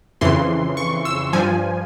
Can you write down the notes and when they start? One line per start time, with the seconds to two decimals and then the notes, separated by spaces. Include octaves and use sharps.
0.21 F2 C#3 E3 C6
0.77 C#6
1.05 E6
1.33 G2 F3 G#5